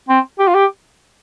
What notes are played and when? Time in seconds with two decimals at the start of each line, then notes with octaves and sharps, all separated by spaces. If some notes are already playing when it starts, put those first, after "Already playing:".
0.09 C4
0.39 G4
0.48 F4
0.55 G4